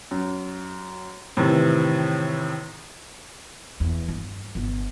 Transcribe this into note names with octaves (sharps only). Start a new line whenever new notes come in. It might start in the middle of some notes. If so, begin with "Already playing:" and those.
F#2
A2 C3 D#3 E3
E2
G2
G1 B3